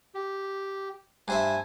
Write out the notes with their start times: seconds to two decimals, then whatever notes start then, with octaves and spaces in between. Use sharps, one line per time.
0.14 G4
1.28 G2 C5 E5 G#5